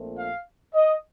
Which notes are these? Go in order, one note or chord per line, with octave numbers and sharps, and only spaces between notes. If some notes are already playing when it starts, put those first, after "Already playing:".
Already playing: A#1 A#2 A3 C4
F5
D#5